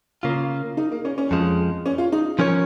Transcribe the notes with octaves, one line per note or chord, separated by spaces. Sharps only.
C#3 A#3 F4
D#4
A#3
C#4
C#4
F2 F3 G#3
C#4
F4
D#4
F3 C#4 A#4 C#5